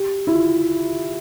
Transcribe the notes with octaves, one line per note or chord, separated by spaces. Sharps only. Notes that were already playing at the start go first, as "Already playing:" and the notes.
Already playing: G4
E4
F4